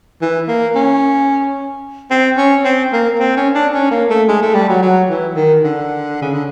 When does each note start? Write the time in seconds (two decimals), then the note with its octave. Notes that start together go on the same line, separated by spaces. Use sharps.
0.21 E3
0.48 A#3
0.75 C#4
2.11 C4
2.37 C#4
2.64 C4
2.93 A#3
3.19 C4
3.37 C#4
3.55 D4
3.74 C#4
3.91 A#3
4.10 A3
4.28 G#3
4.42 A3
4.55 G3
4.69 F#3
4.82 F#3
5.10 E3
5.36 D#3
5.64 D3
6.22 C#3
6.33 D3